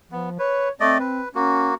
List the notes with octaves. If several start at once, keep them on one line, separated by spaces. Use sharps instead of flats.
F3 B3
B4 C#5
A3 C4 D5 D#5
B4
A#3 C#4 F#4